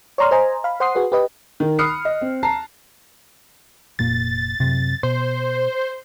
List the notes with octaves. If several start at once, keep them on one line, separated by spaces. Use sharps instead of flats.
C#5 D5 A#5 C6 F6
C5 D#5 G#5 A#5
F5 B5
C5 F#5 C6 D#6 C7
F#4 G#4 B4
G4 B4 D#5
D#3
B5 D#6 F6 F#6 C7 C#7
D#5
C4
A5 A#5 C7
F1 A#2 A#3 A6
F#2 C3
B2 C5